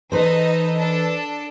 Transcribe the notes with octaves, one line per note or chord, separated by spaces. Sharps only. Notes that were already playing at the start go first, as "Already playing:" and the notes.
E3 D#4 A4 B4 C5 D#5
D4 A4